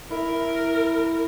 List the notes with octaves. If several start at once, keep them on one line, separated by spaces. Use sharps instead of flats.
E4 A#4